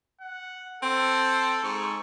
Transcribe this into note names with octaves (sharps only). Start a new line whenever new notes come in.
F#5
C4 A4
G#2 C#6